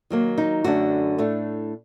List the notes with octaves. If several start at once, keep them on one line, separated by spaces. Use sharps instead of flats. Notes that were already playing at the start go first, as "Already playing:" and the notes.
D#3 F#3 A#3
D#4
F#2 D3 A3 D4 F#4
A2 A3 D4